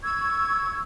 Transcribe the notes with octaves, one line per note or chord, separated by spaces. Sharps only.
C#6 E6 G#6